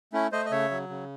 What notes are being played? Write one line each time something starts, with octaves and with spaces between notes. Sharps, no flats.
A3 C#4 E4
A3 C5 D#5
D#5
C#3 C#5 E5
F#3
C#3